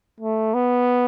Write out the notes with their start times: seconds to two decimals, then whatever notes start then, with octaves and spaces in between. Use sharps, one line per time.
0.20 A3
0.54 B3